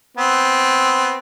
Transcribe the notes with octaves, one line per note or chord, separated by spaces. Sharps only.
B3 C4